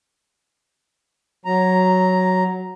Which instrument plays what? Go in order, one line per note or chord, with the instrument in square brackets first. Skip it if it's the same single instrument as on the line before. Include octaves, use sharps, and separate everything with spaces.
[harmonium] F#3 A#5